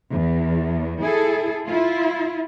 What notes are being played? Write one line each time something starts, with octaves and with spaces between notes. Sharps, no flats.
E2
E4 G#4 A4
E4 F4